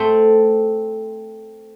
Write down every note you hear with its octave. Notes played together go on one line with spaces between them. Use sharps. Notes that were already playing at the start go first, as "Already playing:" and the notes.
Already playing: A3 C4